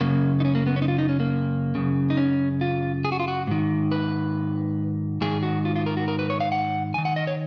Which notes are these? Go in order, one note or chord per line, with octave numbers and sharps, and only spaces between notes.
F#2 C#3 A#3
D#4
C#4
A#3
B3
C#4
D#4
F4
D#4
C#4
A#3
F#2 C#3
D#4
C#4
F4
G#4
F#4
F4
F#4
G#2 D#3
B4
G#2 D#3 G#4
F#4
F4
F4
A#4
F#4
A#4
B4
C#5
F5
F#5
F2 G#5
D#3
F#5
D#5
C#5